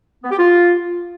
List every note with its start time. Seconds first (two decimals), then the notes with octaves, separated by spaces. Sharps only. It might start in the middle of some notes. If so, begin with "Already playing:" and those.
0.23 B3
0.31 G4
0.38 F4